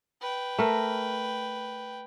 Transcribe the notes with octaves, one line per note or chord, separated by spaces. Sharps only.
B4 G5
A3 A#4